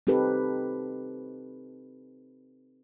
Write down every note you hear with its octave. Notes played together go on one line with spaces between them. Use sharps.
C4 D#4 G4 A4 B4